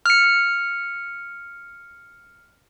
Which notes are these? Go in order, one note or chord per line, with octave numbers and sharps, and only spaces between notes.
F6 C#7